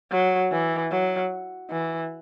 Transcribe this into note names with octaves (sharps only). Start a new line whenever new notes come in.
F#3
E3
F#3
E3